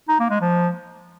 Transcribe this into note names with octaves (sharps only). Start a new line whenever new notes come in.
D#4
A#3
G#3
F3